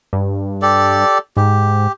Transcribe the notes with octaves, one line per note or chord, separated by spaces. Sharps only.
G2
G4 A4 D5
G#2 G4